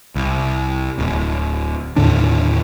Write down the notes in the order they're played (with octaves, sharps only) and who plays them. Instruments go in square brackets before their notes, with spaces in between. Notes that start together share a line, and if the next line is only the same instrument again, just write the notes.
[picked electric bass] C2
D1
D#2 A2 D3 D4